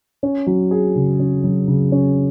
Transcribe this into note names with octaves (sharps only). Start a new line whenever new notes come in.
C#4
F#3
G#4
C#3
C#4
F#3
C#3
C#4